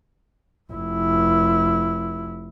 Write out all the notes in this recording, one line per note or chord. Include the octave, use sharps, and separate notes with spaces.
F1 E4